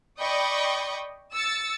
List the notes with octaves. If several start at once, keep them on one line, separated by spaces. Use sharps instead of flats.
D5 D#5 G5 B5 C#6 D#6
E6 A6 C#7